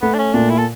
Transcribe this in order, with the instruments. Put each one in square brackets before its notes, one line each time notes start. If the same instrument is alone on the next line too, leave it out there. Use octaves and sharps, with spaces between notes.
[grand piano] A3 [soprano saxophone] B3
[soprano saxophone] D4
C#4
[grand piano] A#2 [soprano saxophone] D4
[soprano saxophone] E4
A4